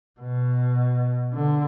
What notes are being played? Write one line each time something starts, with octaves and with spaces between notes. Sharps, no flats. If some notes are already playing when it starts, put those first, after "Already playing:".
B2
D3